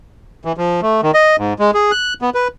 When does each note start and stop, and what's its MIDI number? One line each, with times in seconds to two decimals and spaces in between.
0.45 0.52 52
0.57 0.81 53
0.82 1.01 57
1.03 1.11 51
1.14 1.36 75
1.39 1.53 44
1.59 1.71 56
1.74 1.92 68
1.92 2.14 90
2.22 2.30 59
2.34 2.48 71